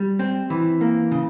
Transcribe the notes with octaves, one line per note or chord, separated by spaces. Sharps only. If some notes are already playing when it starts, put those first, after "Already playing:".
Already playing: G3
C4
E3
A#3
C#3